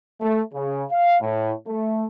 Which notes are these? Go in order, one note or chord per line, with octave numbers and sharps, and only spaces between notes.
A3
C#3
F5
A2
A3